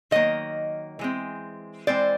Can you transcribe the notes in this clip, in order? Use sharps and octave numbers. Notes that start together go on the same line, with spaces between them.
D#3 F#3 A#3 D#5
E3 G#3 C4
E3 G#3 C4 C5 D5